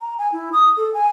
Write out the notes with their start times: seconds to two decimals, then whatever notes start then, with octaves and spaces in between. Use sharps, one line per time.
0.01 A#5
0.18 G#5
0.33 E4
0.53 D#6
0.77 A4
0.94 G#5